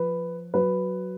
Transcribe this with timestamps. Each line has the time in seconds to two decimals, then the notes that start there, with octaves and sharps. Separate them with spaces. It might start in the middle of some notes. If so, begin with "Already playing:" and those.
Already playing: F3 B4
0.54 F#3 B4